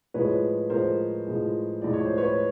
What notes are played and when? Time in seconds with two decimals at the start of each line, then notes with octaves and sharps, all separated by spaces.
0.14 A2 F3 G#3 B4 C#5
0.70 A2 F3 G#3 A#4 C5
1.26 A2 F3 G#3
1.82 A2 F3 G#3 D5
1.93 C#5
2.05 C5
2.18 B4 C#5